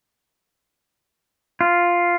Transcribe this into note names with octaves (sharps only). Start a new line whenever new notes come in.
F4